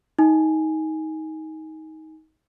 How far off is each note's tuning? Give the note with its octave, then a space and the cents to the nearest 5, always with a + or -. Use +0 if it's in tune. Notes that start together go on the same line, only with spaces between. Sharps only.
D#4 +20 G#5 +0